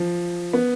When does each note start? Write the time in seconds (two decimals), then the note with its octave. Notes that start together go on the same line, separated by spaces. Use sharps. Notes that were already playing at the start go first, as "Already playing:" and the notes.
Already playing: F3
0.53 B3